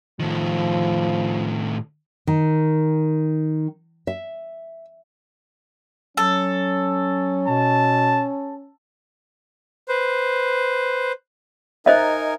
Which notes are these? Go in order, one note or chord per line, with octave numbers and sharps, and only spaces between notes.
A2 D#3 F3
D#3
E5
F#3 C#4 A4
B2 A5
B4 C5
D#4 A#4 C5 D#5 E5 G#5